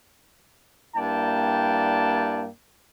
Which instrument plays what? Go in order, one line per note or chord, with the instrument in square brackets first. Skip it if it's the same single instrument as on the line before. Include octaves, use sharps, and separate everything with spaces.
[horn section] G2 A#3 E4 D5 G5 A5